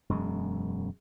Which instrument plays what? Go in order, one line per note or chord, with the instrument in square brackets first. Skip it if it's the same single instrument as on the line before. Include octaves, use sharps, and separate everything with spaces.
[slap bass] E1 F#2 G#3